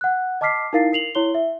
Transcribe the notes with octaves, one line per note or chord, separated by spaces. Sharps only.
F#5 F#6
D#5 A5 D6 F6 B6 C7
D#4 E4 A#4 F5 A6 C7
A#4 C7 F7 F#7
E4 C#5 C6 G7
E5